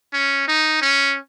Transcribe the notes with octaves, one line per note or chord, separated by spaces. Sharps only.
C#4
D#4
C#4